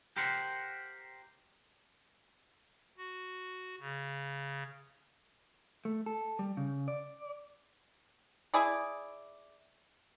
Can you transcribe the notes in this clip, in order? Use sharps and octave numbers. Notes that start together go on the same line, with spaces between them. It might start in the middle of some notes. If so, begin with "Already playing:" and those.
G4 A#4 C5 F#5
F#4
C#3
A3
A4
G3
C#3
D5
E4 G#4 D5